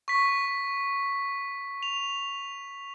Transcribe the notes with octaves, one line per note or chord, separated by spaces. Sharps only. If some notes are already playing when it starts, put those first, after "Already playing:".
C#6 B6
F7